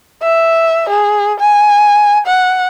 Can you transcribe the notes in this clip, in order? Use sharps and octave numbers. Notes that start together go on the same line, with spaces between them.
E5
G#4
G#5
F#5